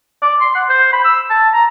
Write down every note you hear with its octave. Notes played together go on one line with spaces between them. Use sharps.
D5
C6
F#5
C5
B5
E6
A5
A#5